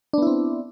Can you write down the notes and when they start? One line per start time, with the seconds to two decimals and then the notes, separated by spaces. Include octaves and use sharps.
0.13 D4
0.18 B3
0.22 E4
0.27 C4